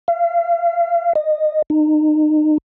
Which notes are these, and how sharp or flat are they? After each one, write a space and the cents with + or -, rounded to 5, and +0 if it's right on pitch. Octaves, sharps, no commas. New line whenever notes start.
F5 -35
D#5 -20
D#4 -30